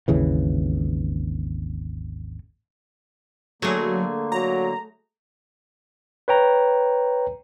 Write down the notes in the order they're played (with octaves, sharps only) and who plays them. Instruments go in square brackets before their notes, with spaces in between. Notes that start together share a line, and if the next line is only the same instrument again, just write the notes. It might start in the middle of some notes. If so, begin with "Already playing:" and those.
[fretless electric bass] G#1 D#2 C#3 E3
[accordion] D3 A#3 [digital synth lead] F#3 [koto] A3 G#4
[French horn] F#3 [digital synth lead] A#5
[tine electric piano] B4 C#5 G5 A#5